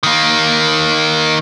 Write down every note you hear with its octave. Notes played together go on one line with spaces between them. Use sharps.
D#3 A#3